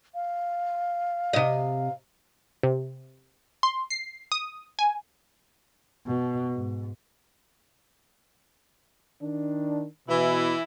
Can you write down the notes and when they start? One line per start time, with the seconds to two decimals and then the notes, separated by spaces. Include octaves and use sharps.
0.15 F5
1.33 C3 D#5
2.63 C3
3.63 C6
3.90 C7
4.32 D#6
4.79 G#5
6.07 B2
6.54 G#2
9.21 D#3 D4
10.08 B2 E3 E4